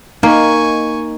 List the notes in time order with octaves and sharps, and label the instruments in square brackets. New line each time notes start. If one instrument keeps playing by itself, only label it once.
[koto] A#3 [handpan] D#4 [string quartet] G#5 C#6